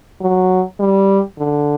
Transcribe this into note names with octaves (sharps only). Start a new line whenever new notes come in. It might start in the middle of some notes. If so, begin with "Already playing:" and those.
F#3
G3
D3